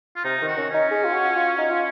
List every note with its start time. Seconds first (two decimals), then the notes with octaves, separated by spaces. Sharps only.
0.16 F4
0.24 C3 D#4
0.42 D#3
0.47 F#4
0.57 C#4
0.69 C#4
0.74 D#4
0.91 G#4
1.05 F4
1.14 F#4
1.36 F4
1.58 D#4
1.70 F4